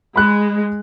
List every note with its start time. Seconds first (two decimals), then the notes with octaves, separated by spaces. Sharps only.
0.16 G#3 B5 F#6